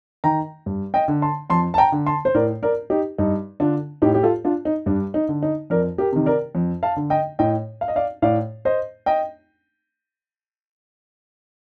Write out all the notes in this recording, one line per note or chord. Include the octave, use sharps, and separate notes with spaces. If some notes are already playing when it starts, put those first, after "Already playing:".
D#3 G5 A#5
G2
D#5 G5
D3
A5 C6
F2 A5 C6
A5
G5 A#5
D3
A5 C6
C5
A2 A#4 D5
A#4 D5
D#4 G4
G2 D#4
D3 D4 F4
A2 D#4 G4
G4
F4 A4
D4 F4
D#4
G2 D4
D#4
D3
D#4
F2 A#4 D5
G4 A#4
C3 D#3
A#4 D5
F2
F5 A5
D3
D#5 G5
A2 D#5 G5
F5
D#5
D5 F5
A2 D5 F5
C5 D#5
D#5 G5